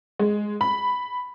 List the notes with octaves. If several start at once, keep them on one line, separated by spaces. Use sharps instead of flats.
G#3
B5